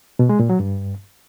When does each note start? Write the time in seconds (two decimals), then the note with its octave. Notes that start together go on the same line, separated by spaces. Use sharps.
0.19 B2
0.29 G#3
0.39 A#2
0.50 F#3
0.60 G2